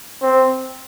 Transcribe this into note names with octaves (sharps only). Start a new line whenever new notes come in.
C4